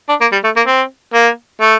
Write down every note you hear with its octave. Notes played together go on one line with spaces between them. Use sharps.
D4
A#3
G3
A3
A#3
C4
A#3
A3